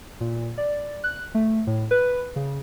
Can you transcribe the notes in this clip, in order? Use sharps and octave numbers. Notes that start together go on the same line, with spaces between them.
A#2
D5
F#6
A3
A2
B4
C#3